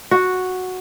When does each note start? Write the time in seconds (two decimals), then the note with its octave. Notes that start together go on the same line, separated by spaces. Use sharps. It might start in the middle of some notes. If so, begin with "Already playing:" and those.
0.11 F#4